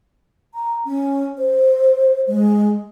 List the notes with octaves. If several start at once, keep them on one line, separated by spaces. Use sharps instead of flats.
A#5
C#4
C5
G#3